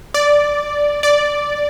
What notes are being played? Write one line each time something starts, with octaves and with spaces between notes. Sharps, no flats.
D5
D5